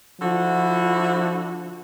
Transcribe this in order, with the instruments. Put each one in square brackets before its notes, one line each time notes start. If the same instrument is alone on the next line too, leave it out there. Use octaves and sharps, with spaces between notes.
[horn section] D3 E4 F#4 [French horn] F3